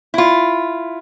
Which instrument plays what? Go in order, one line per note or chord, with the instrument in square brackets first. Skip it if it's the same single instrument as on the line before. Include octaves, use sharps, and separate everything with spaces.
[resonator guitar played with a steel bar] E4 F4